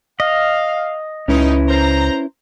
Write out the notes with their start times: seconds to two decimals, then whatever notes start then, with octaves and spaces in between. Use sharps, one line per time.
0.20 D#5 F5
1.28 C#2 C#4 D#4 E4 B4
1.68 C5 A#5